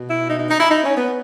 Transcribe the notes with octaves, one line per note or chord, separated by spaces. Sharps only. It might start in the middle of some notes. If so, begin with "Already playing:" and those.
Already playing: B2
E4
D#4
D#4
D#4
E4
D#4
C#4
B3